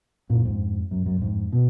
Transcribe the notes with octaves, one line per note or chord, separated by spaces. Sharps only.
F#2 A#2
F2 G#2
F#2
F#2
F2 G#2
B2